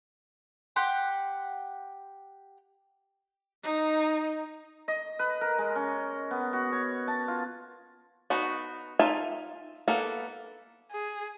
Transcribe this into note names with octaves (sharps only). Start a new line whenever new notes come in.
G4 F#5 C6
D#4
D#5
B4
A#4
G#3
C#4
B3
F#4
C#5
A5
F4
B3 D#4 F#4
D#4 F4 E5 G#5 A5
A#3 B3 A4
G#4